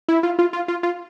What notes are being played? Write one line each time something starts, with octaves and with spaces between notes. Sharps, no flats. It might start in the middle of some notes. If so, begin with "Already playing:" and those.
E4
F4
F4
F4
F4
F4